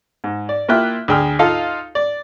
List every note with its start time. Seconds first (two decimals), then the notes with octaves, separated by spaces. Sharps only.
0.24 G#2
0.49 D5
0.68 A#3 E4 F4 E5 G5 F#6
1.08 D2 G#4 G5 E6 F6
1.39 D#4 F4 A4 F5
1.95 D5